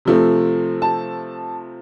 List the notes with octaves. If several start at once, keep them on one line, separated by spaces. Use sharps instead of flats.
C3 F3 A3 C4
A5